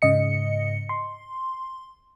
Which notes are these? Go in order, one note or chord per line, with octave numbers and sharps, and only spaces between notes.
G#2 C#3 D#5 C#7
C6